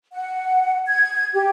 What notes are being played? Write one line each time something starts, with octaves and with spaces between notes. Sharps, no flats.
F#5
G#6
G4